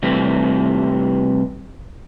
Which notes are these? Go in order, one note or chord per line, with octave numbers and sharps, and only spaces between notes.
C3 E3 G3 A3 C4